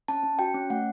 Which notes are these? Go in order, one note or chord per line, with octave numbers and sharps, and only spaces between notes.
C#4 A5
C#4
F#4 G5
C#4
A3 F#5